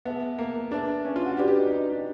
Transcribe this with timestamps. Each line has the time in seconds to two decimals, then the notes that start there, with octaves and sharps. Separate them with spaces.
0.05 B3 G#4 B4 E5 A5
0.39 A#3
0.71 D4 G#4 B4 E5 A5
1.05 C#4
1.16 F4
1.26 F#4
1.37 D4 F#4 G4 B4 D5
1.48 G4
1.59 D#4
1.71 D#4
1.92 D4